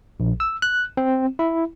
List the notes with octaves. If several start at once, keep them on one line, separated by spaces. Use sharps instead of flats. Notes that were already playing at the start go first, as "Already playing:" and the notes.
A#1
E6
F#6
C4
E4